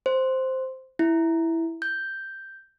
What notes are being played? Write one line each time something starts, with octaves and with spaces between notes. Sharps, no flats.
C5
E4
G6